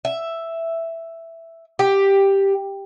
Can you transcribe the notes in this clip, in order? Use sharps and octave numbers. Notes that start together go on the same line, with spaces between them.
E5
G4